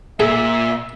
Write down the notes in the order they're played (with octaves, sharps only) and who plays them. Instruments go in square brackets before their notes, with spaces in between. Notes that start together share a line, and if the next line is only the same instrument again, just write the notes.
[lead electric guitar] A#2 [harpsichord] G#4 [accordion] E5